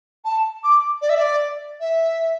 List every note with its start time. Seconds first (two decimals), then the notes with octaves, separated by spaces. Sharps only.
0.25 A5
0.63 D6
1.01 D5
1.09 E5
1.17 D5
1.80 E5